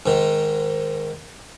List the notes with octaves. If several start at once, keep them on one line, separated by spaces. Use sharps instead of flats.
G#2 D#3